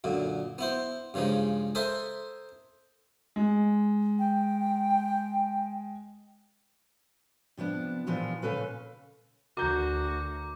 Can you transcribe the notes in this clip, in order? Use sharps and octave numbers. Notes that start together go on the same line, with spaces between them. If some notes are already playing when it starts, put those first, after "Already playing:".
F#2 A#2 D3
B3 E4 C5
G2 C#3 F3 G#3 D#4
A4 A#4 C5 D#5 E5 G#5
G#3
G5
C3 F3 B3 D4
A#2 E3 F3 F4 G4
A#2 C#3 C#4 A4 B4 F5
D2 F#4 A#4 A#5 D6 G6